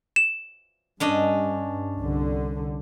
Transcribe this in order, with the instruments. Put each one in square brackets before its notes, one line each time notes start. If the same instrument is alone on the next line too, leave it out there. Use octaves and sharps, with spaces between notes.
[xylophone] E7
[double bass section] G2 [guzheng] C#4 D4 D#5
[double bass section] C2 D3